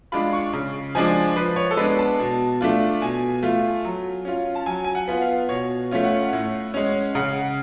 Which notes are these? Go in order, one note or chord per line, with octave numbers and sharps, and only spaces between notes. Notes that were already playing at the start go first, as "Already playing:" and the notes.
G#3 D4 F4 B5
C#6
C#3
F3 G#3 D4 G#5
F3 B4
C#5
A4
G#3 B3 D4 B4
A5
B2
A3 D4 F4
B2 G#5
A3 F4
F#3
C#4 F4
A5
F#3 G#5
G#5
F#5
B3 F4
F5
B2 C#5
A3 C#4 F4
F#5
A2
G#3 C#4
C#3 F#5